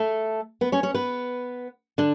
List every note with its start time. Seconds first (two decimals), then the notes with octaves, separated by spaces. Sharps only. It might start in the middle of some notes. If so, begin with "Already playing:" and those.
Already playing: A3 A4
0.61 B3 B4
0.72 C#4 C#5
0.83 C#4 C#5
0.94 B3 B4
1.98 D3 D4